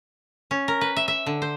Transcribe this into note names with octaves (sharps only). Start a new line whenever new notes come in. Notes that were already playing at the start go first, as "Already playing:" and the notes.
C#4
A#4
B4
E5
E5
D3
C5